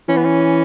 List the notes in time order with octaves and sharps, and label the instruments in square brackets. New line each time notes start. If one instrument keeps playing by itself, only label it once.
[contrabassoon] E3 [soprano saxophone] C#4
[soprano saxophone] B3
C#4